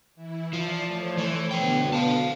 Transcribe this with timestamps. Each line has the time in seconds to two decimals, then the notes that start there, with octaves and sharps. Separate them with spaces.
0.15 E3 E4
0.53 F3 D5 A5
0.86 A3 C5 C#5
1.18 E3
1.51 B2 D3 B3 B4 G5
1.93 F5 A5